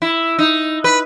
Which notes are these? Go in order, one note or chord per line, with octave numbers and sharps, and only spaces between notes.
E4
D#4
B4